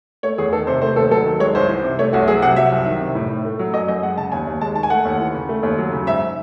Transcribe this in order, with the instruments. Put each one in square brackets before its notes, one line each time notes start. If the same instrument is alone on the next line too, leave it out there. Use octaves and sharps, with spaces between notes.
[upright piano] A3 C#5
E2 G#4
D#3 A4
C3 C5
A3 C5
D#2 A4
F#3 A4
D#3
G#3 C#5
C2 C5
E3
C3
A3 C#5
C2 F#4
F#3 G#4
C3 F#5
F#3 E5
C2
D#3
C3
A2
A2
A3
F#3
F#2 D#5
F#2 D#5
G#3 F#5
C#3 A5
D#2 G#5
D#2
G#3 A5
D#3 A5
G#5
A3 F#5
D#2
E3
C#3
A3
D#2
F#3
C#3
G#2 E5